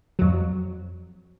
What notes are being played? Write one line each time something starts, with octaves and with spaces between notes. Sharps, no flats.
F2 F#3